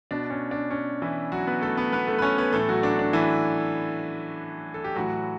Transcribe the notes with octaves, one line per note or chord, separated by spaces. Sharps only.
B2 D4
C#4
D4
C#4
E3 E4
F#3 F#4
B3 B4
A3 A4
B3 B4
B3 B4
A3 A4
B4
C#4 C#5
B3 B4
A2 E3 A3 A4
F#3 F#4
D4
D4
E3 E4
A4
G4
A2 E3 F#3 F#4